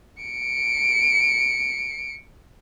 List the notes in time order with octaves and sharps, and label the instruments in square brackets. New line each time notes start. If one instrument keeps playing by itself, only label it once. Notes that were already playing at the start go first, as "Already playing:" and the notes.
[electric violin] C#7 D7